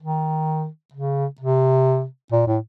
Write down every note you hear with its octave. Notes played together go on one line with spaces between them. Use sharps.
D#3
C#3
C3
A#2
A2